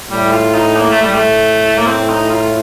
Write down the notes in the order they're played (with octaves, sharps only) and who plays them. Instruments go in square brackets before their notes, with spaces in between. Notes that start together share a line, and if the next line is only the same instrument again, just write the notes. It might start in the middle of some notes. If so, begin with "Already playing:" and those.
[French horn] A2 [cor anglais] G3
[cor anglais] F4
D#4
A#3
A3
[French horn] A2 [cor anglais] G3
[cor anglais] A3
A#3
C4
D#4
F4